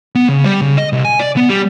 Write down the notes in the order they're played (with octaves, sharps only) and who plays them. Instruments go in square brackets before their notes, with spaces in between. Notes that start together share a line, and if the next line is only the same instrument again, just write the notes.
[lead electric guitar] B3
C#3
G3
C#3
D#5
C2
G#5
D5
B3
G3